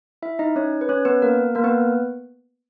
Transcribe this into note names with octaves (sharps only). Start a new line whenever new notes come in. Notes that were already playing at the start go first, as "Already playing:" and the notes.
E4 E5
D#4 D#5
C#4 C#5
B4
C#4 C#5
B3 B4
A#3 A#4
A#3 A#4
B3 B4